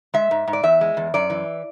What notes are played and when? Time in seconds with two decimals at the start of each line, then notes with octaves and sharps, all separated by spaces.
0.14 G#3 E5
0.31 G#2
0.48 G#2
0.53 D5
0.63 E2 E5
0.81 G#3
0.97 E2
1.14 F#2 D5
1.30 E3